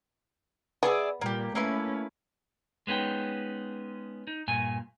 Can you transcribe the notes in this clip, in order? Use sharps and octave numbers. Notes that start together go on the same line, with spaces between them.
B3 G#4 D5 E5
A#2 G3 A#3 G4
A3 A#3 C#4 E4 B4
G#3 B3 C#4 D#4 G5
D#4
G2 A#2 G#5